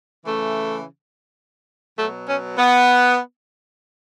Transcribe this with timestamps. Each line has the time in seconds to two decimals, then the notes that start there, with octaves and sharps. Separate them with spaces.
0.24 C#3 E3 A3
1.98 B2 F#3 A3
2.27 C#4
2.57 B3